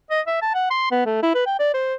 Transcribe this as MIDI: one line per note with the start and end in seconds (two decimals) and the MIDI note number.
0.11 0.21 75
0.27 0.39 76
0.42 0.52 81
0.54 0.68 78
0.70 0.87 84
0.91 1.03 59
1.06 1.19 57
1.23 1.30 64
1.35 1.44 71
1.47 1.56 79
1.60 1.71 74
1.74 1.95 72